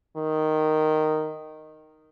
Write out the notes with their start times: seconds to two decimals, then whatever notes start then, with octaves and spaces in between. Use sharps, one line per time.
0.17 D#3